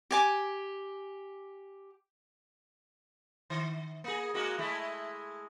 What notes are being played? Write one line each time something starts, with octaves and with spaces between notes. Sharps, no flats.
G4 G#5 D6
D#3
A#3 G#4
G#3 A#3 F#4
G#3 A3 E4